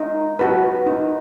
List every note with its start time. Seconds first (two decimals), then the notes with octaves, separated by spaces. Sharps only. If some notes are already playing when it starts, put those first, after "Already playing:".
Already playing: D#4
0.39 F#4 B4
0.86 D#4